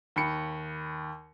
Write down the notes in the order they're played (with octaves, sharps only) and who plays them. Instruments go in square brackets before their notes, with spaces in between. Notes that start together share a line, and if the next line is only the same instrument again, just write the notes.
[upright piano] D#2 B5 C#7